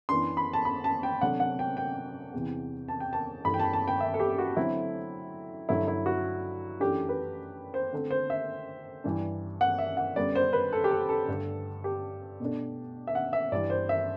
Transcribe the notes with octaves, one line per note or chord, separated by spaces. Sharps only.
F#2 E3 B3 D4 C6
B5
A5
B5
A5
G5
C3 F#3 A3 D4 F#5
F#5
G5
G5
E2 C3 E3
A5
G5
A5
G2 E3 A3 B5
G5
A5
A5
G5
E5
A4
G4
F#4
D3 F#3 A3 C4 E4
G2 D3 F#3 A3 E4
E4
F#4
F#2 E3 A3 D4 G4
B4
C5
D3 A3 C4
C5
E5
G2 E3 G3 D4
F#5
E5
F#5
F#2 D3 G3 B3 D5
C5
B4
A4
G4
A4
A4
G2 D3 A3 D4
G4
B2 A3 D4
E5
F#5
E5
G2 E3 G3 D5
C5
E5